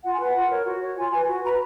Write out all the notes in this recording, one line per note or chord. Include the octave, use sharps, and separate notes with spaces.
F4 F#5
G#5
B4 F#5
F4
A#4 C#5
F#4
C#5
F4 G#5
B4 G#5
F#4
B4 A#5